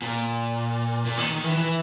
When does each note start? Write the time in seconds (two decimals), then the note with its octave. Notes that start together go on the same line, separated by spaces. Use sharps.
0.02 A#2
1.05 A#2
1.18 D#3
1.31 D#3
1.44 E3
1.56 E3